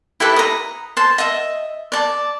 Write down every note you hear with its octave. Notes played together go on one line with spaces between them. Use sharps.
E4 G4 A4 B4
A#5 D#6
C5 A5
D#5 E5
D5 A5